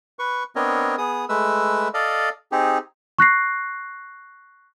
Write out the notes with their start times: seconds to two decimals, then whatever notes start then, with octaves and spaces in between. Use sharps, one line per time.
0.19 B4 C#6
0.56 B3 C4 D4 A#4 C#5 D#5
0.98 B3 G#4 D#6
1.29 G#3 A3 B4 E6
1.94 A4 D5 D#5 F5
2.52 C4 D#4 G4 G#4
3.19 C#6 F#6 A#6 C7